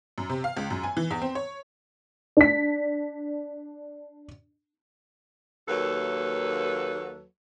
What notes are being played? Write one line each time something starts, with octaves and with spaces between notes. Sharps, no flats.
F#2
C3
F5
C#2
F#2
G#5
E3
E2
C4
C#5
D4 B6
D#2 F#3 A#3 A4 B4